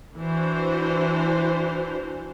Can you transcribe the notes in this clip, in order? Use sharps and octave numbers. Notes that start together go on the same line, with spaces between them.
E3 D4 F#4 C5